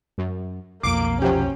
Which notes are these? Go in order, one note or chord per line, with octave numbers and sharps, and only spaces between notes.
F#2
B1 F2 A#3 D6 C7 D7
C3 F3 F#3 C#4 G4